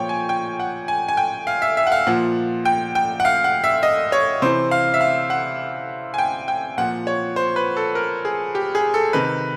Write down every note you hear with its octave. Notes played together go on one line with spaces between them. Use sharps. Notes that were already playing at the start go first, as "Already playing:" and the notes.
Already playing: A#2 F3 C#5 G5
G#5
G5
F#5
G#5
G#5
G5
F5
E5
E5
F#5
F5
A#2 F3 F#5
G5
G5
F#5
F5
F#5
E5
D#5
C#5
C3 E3 C5
F5
E5
F5
F#5
G#5
G5
G5
A#2 F3 F#5
C#5
C5
B4
A4
A#4
G#4
G4
G#4
A4
C3 D#3 B4